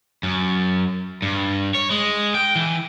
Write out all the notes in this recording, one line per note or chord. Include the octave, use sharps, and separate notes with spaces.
F#2
G2
C#5
G#3
G5
E3